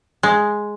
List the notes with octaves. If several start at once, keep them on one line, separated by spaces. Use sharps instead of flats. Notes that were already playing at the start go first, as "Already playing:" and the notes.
G#3